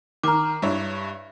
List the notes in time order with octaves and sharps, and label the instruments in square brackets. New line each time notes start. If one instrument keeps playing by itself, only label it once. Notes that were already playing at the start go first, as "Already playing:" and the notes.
[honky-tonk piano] D#3 F6 [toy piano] A#5 D6
[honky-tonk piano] G2 E4 C#5